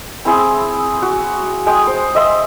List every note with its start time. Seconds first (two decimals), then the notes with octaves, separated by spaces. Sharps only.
0.25 C4 E4 G#4
1.02 F#4
1.66 G#3 G5 D#6
1.87 C5
2.15 D#5 E5 C6